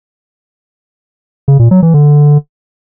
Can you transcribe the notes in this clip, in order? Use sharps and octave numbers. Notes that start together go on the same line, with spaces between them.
C#3
A#2
F#3
E3
D3